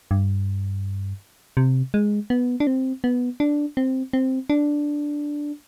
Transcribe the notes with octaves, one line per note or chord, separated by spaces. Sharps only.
G2
C3
G#3
B3
D4
C4
B3
D4
C4
C4
D4